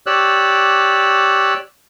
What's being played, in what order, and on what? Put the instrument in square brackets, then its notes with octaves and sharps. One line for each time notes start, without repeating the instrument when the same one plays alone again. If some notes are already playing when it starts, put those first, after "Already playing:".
[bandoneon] G4 C#5 D5 E6 F#6